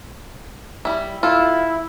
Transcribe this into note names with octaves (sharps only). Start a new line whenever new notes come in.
G3 E4
E4 F4 A4